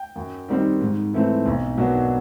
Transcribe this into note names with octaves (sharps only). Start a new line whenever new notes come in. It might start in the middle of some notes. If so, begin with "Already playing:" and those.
Already playing: G5
F#2
D#3 G3 C4 D#4
G#2
E3 A3 C4
B1
B2 F#3 A#3 D4